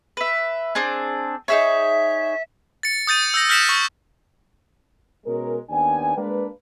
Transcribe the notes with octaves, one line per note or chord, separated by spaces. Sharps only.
B4 E5
C4 D4 G#4
D#4 G#4 C#5 E5
A6 C#7
D#6 G6 A6 D#7
E6 G6 A#6
F6 G6 A#6 B6 C#7 E7
C#6
B2 G#3 C#4 A#4
D#2 B3 D4 G5 G#5
G#3 A#3 D4 B4